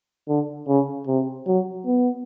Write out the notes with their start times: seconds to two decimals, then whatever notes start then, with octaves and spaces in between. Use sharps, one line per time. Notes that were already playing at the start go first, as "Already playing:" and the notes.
0.28 D3
0.68 C#3
1.07 C3
1.47 F#3
1.86 B3